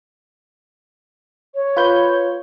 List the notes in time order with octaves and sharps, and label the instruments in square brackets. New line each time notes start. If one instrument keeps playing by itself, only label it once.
[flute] C#5
[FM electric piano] F4 B4 G6